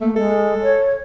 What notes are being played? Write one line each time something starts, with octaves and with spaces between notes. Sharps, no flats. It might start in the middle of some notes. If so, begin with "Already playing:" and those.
A3 A#3
G#3 A4
C#5